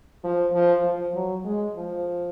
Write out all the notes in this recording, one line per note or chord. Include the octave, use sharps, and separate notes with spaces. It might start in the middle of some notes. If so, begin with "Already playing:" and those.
F3
F3
F3
F#3
G#3
F3